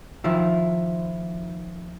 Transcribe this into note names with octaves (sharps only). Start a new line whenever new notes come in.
D#3 F3 E4